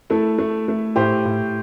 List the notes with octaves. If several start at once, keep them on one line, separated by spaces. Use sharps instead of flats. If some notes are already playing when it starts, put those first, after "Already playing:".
A3 E4 A4
A3
A3
A2 G4 C5
A2